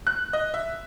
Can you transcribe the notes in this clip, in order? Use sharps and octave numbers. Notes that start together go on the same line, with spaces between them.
F#6
D#5
E5